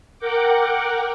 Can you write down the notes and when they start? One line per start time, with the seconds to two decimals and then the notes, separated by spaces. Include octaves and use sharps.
0.19 A#4 F#5 G5 D6